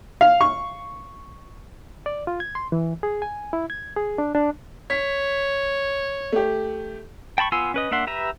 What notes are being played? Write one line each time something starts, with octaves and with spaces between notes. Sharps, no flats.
F5
C#6
D5
F4
G#6
C6
E3
G#4
G#5
E4
G#6
G#4
D4
D4
C#5 B6
A3 G4
G5 A5 B5 C#6
B3 F4 G#5 C6 E6
C#4 B4 D#5
A#3 D4 E5 F#5 C6
G4 B4 E5 A#5